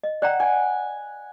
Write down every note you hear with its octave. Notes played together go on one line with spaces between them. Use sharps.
D#5
D5 F#5 G5 A#5
G#5